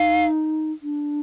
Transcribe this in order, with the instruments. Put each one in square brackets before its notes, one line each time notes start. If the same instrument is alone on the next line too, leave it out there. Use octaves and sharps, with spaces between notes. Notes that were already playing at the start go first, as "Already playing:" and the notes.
Already playing: [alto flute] D#4 [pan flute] F5
[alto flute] D4